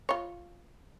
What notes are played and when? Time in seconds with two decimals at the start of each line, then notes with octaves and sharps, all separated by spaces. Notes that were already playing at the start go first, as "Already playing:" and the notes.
0.09 F4 C#5